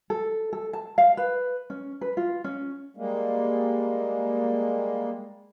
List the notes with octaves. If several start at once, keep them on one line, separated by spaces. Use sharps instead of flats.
A4
A4
A5
F5
B4
C#4
B4
F4
C#4
G3 G#3 A#3